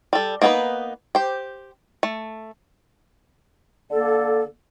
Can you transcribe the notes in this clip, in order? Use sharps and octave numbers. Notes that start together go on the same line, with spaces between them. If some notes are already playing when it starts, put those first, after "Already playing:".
G3 A4
A#3 B3 D#4 A4 B4
G4 C5
A3
D3 A#3 A4